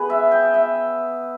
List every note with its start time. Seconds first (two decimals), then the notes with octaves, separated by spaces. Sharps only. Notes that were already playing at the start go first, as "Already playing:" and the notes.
Already playing: B3 G#4 B4
0.10 E5
0.32 G5
0.54 E5